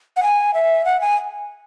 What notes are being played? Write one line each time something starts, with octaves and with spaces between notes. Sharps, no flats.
F#5
G#5
E5
F#5
G#5